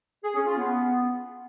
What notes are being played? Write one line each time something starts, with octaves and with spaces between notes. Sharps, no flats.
G#4
C#4
F4
B3